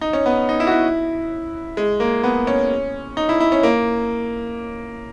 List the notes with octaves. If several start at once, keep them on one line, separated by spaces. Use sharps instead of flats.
D#4
C#4
B3
D#4
E4
F#4
E4
G#3
A#3
B3
C#4
D#4
E4
E4
C#4
A#3